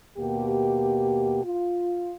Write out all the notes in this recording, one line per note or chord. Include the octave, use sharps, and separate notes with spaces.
D#2 B2 A#3 G4
F4